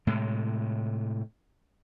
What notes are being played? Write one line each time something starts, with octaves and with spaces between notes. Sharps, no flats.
A2 C3 G#3